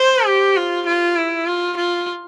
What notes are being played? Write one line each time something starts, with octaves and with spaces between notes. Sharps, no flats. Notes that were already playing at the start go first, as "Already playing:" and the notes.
Already playing: C5
G4
F4
F4
E4
F4
F4